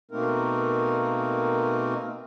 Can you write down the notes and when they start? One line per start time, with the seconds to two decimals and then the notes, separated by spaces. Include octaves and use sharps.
0.11 B2 A3 A#3 C4 D#4 A#4